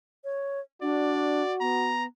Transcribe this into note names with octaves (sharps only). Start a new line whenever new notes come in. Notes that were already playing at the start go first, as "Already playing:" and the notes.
C#5
D4 F#4 D5
B3 A#5